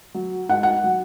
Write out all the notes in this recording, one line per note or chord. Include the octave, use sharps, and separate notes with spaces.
F#3
G#2 F#5
F#5
F#3